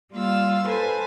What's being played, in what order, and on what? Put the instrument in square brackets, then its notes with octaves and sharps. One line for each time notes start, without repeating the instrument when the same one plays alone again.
[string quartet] G3 A#3 F4 F5 E6
A4 B4 C5 G#5 A5